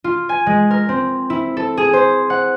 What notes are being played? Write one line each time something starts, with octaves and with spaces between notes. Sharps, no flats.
F4
G#5
G#3
A#4
C4
E4
A4
G#4
C5
F#5